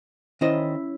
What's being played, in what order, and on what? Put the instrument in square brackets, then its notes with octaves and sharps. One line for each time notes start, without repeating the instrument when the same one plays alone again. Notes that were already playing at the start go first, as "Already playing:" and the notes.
[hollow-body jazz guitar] D#3 C5 D#5 [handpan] C#4 E4